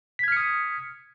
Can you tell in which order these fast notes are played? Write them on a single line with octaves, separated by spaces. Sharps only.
B6 G#6 F6 C#7 D#6